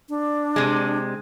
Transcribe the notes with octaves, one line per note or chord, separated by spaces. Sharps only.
D4
C3 G#3